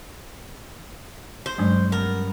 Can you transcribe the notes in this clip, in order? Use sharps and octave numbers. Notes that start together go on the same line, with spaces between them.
C5
G2 F#3 G#3 C#4 D4
B3 A#4